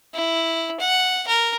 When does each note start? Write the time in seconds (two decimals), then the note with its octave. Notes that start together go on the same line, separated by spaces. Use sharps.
0.14 E4
0.80 F#5
1.27 A#4